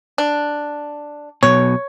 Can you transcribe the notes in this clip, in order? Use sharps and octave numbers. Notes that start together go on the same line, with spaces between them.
D4
B1 B2 C#5